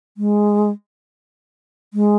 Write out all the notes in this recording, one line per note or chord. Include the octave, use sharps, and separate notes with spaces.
G#3
G#3